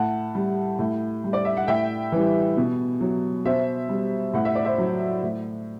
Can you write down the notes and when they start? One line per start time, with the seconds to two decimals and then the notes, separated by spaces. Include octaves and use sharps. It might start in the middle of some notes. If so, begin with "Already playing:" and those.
Already playing: A2 F#5 A5
0.35 G3
0.79 A2
1.24 G3
1.33 D5
1.45 E5
1.57 F#5
1.68 A2 E5 G5
2.12 E3 G3
2.57 B2
3.01 F#3
3.45 B2 C5 E5
3.89 G3
4.33 A2 F#5
4.45 E5
4.55 D5
4.65 C5 E5
4.78 F#3
5.23 A2